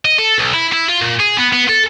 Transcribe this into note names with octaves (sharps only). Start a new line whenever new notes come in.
D#5
A4
B1
E4
E4
F4
A#2
G#4
B3
B3
A4